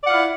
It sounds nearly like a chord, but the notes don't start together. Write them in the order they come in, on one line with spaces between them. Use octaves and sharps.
D5 F#5 F4 E4